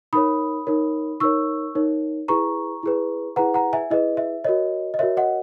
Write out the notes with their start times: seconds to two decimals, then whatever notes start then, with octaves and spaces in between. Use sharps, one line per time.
0.13 D#4 A#4 C#5 B5 D#6
0.67 D#4 A#4 C#5
1.20 D#4 A#4 C#5 C#6 E6
1.75 D#4 A#4 C#5
2.28 E4 G#4 B4 A#5 C#6
2.83 E4 G#4 B4
3.36 E4 G#4 B4 F#5 A#5
3.54 F#5 A#5
3.73 E5 G#5
3.90 E4 G#4 B4 D#5
4.17 E5
4.44 F#4 A#4 C#5 D#5
4.94 D#5
4.99 F#4 A#4 C#5 E5
5.17 D#5 F#5